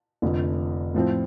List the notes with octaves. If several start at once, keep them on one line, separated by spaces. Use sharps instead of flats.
F1 F2 D3
A2 F3 C4